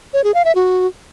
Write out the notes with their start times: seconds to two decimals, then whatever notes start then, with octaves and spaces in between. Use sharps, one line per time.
0.13 C#5
0.24 G#4
0.34 F5
0.45 E5
0.55 F#4